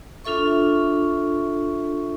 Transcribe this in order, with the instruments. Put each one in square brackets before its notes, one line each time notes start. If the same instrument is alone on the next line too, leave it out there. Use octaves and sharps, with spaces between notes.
[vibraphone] D4 F4 A4 E5 C#6